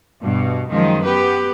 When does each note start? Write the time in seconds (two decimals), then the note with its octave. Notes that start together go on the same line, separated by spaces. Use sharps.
0.21 G2 B2
0.70 F#2 D#3 F3 G#3
1.04 B3 G4 B4